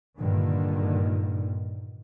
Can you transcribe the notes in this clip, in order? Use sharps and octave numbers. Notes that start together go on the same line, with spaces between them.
G2 A#2 D3 D#3